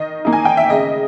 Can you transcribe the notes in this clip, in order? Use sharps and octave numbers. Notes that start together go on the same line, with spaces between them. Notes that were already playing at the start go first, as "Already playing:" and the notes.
Already playing: D#3 D#5
A#3 D#4
G#5
G5
E5
C#3 D#5